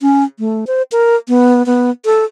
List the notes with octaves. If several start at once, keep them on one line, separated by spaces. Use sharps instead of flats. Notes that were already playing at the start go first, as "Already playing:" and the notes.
C#4
A3
C5
A#4
B3
B3
A4